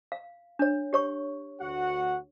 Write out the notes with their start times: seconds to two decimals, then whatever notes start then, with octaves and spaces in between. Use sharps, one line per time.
0.12 F5
0.59 D4 C#5
0.93 G4 C#5 C#6
1.61 D2 F#4 F#5